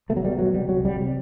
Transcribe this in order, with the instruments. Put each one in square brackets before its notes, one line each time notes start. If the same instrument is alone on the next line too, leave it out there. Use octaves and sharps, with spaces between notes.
[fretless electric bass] B2 A3
F#3
B2 G3
B2 F#3
C2 G3
C2 F#3
C2 G3
C3